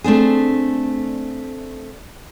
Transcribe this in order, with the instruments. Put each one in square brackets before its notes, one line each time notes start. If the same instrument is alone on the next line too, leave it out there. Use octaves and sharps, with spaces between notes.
[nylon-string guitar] A3 C4 D4 G#4